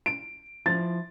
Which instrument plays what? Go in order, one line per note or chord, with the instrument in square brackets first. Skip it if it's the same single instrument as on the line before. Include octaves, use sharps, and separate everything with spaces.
[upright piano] D7
[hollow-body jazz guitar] F3 E4 [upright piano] A6